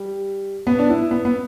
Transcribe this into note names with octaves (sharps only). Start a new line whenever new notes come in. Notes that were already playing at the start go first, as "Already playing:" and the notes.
Already playing: G3
B3
D4
E4
B3
B3